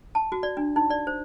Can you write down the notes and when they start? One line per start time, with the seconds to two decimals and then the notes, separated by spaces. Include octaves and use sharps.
0.15 A5
0.32 F#4
0.43 D5
0.57 D4
0.76 D#4
0.90 D5
1.07 C5